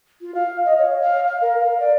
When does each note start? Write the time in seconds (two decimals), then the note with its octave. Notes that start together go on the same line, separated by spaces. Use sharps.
0.21 F4
0.34 F5
0.65 D#5
0.78 C#5
1.02 F5
1.27 F5
1.41 A#4
1.59 F5
1.80 D5